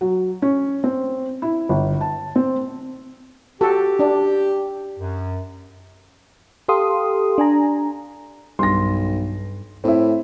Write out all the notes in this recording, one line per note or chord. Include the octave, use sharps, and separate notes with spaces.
F#3
C#4
C4
E4
G1
A5
C4
F#4 G4 A4
D4 D5
F#2
G4 A4 F5 C6 D#6
D4 G#5 A#5
B1 G2 C6 A#6
A2 C4 E4